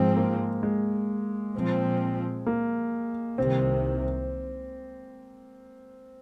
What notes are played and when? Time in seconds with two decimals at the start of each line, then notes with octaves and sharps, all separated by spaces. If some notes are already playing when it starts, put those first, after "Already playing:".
Already playing: G#2 F3 G#3 C4
0.16 A#3
0.63 G#3
1.54 A#2 F3 C4
2.46 A#3
3.38 C2 C3 D#3 C4